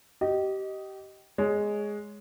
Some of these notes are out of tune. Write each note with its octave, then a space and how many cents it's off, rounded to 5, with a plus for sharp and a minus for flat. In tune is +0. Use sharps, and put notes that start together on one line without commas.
G4 -25 D#5 +0
G#3 +0 C#5 +10